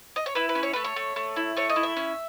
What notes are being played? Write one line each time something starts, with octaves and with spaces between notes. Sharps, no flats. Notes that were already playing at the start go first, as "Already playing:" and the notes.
D#5
C#5
E4 B4
B4
C#4
C#5
A3 B4
C#5
A3
A3
E4
A3 C#5
D#5
E4
E5
C#4